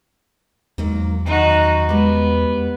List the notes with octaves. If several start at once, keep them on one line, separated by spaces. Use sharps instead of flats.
E2 G#2 F#3 A#3
F#2 D#3 D#4 F#4 A#5
G#3 B3 G4